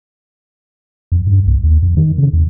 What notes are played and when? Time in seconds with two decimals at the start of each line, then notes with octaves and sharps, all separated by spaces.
1.12 F2
1.27 G2
1.47 C2
1.64 D#2
1.83 F2
1.97 D#3
2.18 C#3
2.33 E2